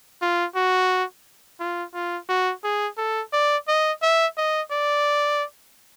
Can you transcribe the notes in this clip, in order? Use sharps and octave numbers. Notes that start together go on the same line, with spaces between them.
F4
F#4
F4
F4
F#4
G#4
A4
D5
D#5
E5
D#5
D5